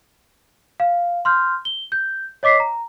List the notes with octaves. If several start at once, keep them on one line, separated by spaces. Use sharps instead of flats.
F5
C6 F6 G6
G7
G6
C#5 D#5 D6 B6 C7
A#5